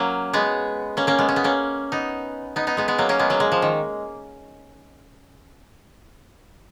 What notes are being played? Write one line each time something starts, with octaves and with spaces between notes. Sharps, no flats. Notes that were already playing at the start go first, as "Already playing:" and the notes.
Already playing: F#3 A#3 C#4
G#3 B3
A#3 C#4
A#3 C#4
G#3 B3
C#4
B3
A#3 C#4
B3 D#4
B3 D#4
B3 D#4
G#3 B3
G#3 B3
F#3 A#3
A#3 C#4
G#3 B3
F#3 A#3
G#3
F3
D#3